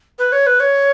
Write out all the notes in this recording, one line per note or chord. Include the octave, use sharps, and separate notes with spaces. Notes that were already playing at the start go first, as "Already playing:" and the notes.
B4
C#5
B4
C#5